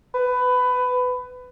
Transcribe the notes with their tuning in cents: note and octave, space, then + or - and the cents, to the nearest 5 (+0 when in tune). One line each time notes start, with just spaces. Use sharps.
B4 +20